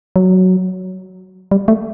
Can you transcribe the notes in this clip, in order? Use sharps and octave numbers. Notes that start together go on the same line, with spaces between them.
F#3
G3
A3